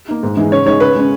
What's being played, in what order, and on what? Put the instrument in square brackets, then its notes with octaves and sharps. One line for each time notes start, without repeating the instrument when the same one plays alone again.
[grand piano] A#3 D#4
G#2
E3 G#3 D#4
[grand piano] C#3 [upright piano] C#5
[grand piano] G#3 D#4 [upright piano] C#5
[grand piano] C#3 [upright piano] B4
[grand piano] G#3 C#4